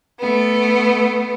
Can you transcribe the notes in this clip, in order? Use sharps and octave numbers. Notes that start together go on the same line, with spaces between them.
A3 B3